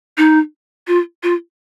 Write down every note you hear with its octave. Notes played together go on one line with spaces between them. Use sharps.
D#4
F4
F4